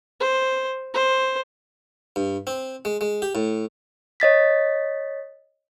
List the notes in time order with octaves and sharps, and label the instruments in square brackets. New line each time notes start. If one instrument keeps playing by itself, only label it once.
[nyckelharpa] C5
C5
[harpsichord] G2
C4
G#3
G#3
G4
A2
[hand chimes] C#5 D#5 A6 B6